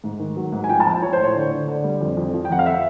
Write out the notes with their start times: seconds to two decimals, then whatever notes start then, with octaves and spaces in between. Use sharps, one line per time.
0.04 G#2
0.19 D#3
0.36 F#3
0.52 G#2
0.64 G#5
0.69 F3 G5
0.80 A5
0.86 A#1
1.02 F3 C#5
1.13 C5
1.18 A2
1.24 C#5
1.35 D3
1.51 D3
1.68 D3
1.84 G3
2.01 F2
2.17 F2
2.33 F3
2.45 G5
2.50 F2 F#5
2.59 F5
2.66 E5